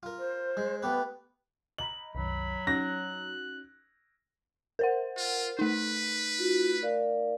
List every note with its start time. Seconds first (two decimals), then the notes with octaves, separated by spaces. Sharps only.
0.03 F4 A#4
0.19 C5
0.57 G#3
0.83 A3 B3 G4 B4
1.78 D#5 A#5 B5 F#7
2.15 C2 F#2 D#3 F#3 B5
2.67 C#4 D#4 F#4 F#6 A#6
4.79 A#4 C5 F#5
5.18 F4
5.59 A3 D#4 B4
6.39 F4 F#4
6.82 A#4 D5 F5